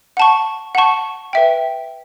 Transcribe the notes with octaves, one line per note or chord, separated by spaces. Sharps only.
F#5 A5 C#6
F#5 A5 C#6
B4 E5 G5